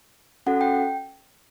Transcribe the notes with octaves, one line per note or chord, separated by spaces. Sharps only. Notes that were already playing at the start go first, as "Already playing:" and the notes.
C#4 F#4 A4 F#5
G5